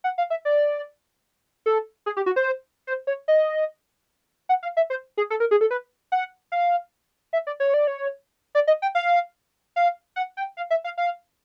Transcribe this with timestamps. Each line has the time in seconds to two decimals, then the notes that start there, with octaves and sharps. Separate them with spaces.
0.04 F#5
0.18 F5
0.30 E5
0.45 D5
1.66 A4
2.06 G#4
2.17 G4
2.26 F#4
2.36 C5
2.87 C5
3.07 C#5
3.28 D#5
4.49 F#5
4.63 F5
4.77 E5
4.90 C5
5.17 G#4
5.30 A4
5.40 A#4
5.51 G#4
5.61 A4
5.71 B4
6.12 F#5
6.52 F5
7.33 E5
7.47 D5
7.60 C#5
7.74 D5
7.87 C#5
8.55 D5
8.67 D#5
8.82 G5
8.95 F5
9.76 F5
10.16 F#5
10.37 G5
10.57 F5
10.70 E5
10.84 F5
10.98 F5